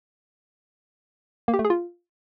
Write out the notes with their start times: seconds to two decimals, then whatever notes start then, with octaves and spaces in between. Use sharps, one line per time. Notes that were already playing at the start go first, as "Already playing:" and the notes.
1.48 A#3
1.54 G4
1.59 A3
1.65 G#4
1.70 F4